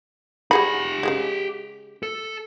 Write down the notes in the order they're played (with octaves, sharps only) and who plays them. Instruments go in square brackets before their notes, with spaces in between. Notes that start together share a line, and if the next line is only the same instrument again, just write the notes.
[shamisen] G3 G#4 B5 [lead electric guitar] G4 F#5
[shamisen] C#3 G3 G#3
[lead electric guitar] A4